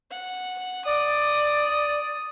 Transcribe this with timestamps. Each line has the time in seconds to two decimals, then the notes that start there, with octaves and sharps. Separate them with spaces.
0.11 F#5
0.85 D5 D#6